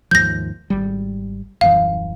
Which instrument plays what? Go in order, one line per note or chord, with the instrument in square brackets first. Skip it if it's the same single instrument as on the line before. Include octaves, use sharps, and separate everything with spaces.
[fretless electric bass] D#2 G#2 F3 [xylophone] G6 A#6
[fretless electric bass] G#1 G3
[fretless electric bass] D#1 F#2 E3 [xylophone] F5